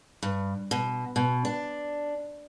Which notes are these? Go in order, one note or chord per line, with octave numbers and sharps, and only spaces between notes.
G2
B2
B2
D4